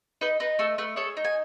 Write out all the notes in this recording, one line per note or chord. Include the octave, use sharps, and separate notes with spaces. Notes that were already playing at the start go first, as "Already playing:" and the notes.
D#4 B4 D#5
D#4 B4
A3 A4
A3 B4
G#4 A4 C#5
D#4
G#5